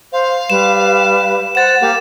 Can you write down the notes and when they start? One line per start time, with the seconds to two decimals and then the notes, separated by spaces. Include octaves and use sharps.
0.12 C5 F5
0.50 G3 B4 E7
1.55 C5 F#5 A6 E7
1.81 A#3 G4 F5